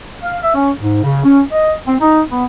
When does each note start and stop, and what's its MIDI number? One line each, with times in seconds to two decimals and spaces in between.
0.22 0.37 77
0.42 0.53 76
0.55 0.71 61
0.80 0.99 44
1.03 1.24 49
1.24 1.41 61
1.52 1.73 75
1.87 1.95 60
2.01 2.21 63
2.30 2.45 59